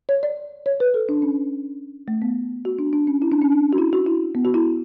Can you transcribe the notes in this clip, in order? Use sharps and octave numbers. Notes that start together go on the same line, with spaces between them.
C#5
D5
C#5
B4
A4
D4
C#4
A3
B3
F#4
D4
D4
C#4
E4
D4
C#4
D4
F#4
E4
F#4
E4
B3
F#4
E4